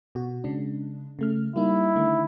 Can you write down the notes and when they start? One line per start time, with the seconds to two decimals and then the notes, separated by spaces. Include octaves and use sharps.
0.15 B2 F#4
0.44 C#3 G#3 D4
1.19 C#3 A3 F6
1.56 G3 A#3 D#4 E4
1.95 D3 D#3 A3